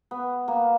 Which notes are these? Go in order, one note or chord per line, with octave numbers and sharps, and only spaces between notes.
B3
A#3